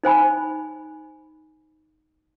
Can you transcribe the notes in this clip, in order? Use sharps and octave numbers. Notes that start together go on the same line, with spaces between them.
D#4 C5 G#5 B5